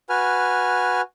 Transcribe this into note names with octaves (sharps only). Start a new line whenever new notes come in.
F#4 B4 G#5 F6